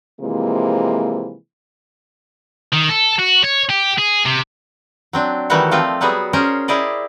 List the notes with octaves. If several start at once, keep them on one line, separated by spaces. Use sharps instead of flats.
C3 E3 F3 G#3 A#3
D#3
A4
F#4
C#5
G4
G#4
C3
F#3 C4 D4
D#3 E3 G3 A3 F#4 C#5
F3 A3 C4 F4
F#3 G3 B3 F#4 G#4
C#4 G#4 A#4 C5
E4 G4 G#4 D5 D#5